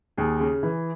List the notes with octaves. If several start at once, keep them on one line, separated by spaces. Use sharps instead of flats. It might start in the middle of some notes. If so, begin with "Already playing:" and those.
D#2 G#4
C#3
E3